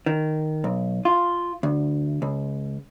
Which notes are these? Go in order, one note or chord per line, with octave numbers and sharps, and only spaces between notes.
D#3
B1
F4
D2
C#2